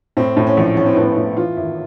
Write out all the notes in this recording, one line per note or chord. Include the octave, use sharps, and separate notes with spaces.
A2 C4
A2
C#4
A#1
A#1 C#4
C4
A2 B3
C4
A2
E3 F4
G#1 E4